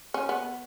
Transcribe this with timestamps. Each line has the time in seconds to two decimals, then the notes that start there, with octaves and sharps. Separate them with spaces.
0.14 C#4
0.29 B3